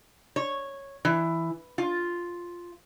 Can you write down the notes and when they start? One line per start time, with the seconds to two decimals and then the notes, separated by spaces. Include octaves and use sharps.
0.36 C#5
1.05 E3
1.78 F4